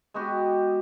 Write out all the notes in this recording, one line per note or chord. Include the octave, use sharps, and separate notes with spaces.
G#3 B3 F#4 G4